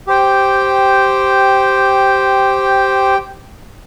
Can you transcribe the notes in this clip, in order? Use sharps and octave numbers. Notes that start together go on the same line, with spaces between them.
G4 C5 G5